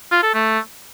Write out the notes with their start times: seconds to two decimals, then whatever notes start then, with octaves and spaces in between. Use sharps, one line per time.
0.12 F4
0.23 A4
0.34 A3